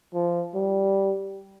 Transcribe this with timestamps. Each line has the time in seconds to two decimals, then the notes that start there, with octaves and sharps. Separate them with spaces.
0.14 F3
0.55 G3